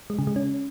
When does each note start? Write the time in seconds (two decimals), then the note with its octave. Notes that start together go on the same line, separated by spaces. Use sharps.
0.10 G#3
0.19 C#3
0.27 G#3
0.36 C#4